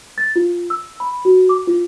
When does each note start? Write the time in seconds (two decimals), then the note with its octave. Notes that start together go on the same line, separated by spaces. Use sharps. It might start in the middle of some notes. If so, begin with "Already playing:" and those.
0.18 A6
0.36 F4
0.70 E6
1.00 B5
1.25 F#4
1.49 D6
1.67 F4